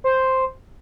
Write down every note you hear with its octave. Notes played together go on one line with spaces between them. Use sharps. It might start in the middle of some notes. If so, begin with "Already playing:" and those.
C5